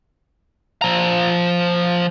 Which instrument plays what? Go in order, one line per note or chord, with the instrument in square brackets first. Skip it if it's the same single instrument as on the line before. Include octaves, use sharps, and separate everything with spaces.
[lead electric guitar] F3 A#5